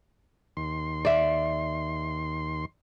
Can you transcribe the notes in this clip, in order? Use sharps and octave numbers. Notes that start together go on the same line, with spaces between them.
D#2 C6
D5 E5